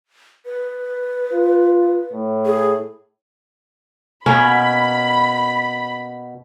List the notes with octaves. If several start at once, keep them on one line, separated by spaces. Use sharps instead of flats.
B4
F4
A2
G#4
B2 A#3 C#4 B5